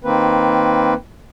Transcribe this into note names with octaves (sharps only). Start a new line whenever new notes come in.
D#3 A#3 C4 B4